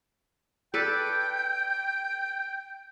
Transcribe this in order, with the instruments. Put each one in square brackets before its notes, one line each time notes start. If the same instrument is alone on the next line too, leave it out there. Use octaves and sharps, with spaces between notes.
[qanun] A4 B4 D5 [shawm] G5